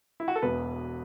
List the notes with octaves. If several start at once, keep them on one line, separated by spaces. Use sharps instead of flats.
E4
F#4
A4
E1 E2 B2 B3 B4